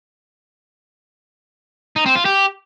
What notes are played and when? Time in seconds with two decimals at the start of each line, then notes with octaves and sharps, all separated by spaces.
1.96 D#4
2.06 C4
2.16 F4
2.25 G4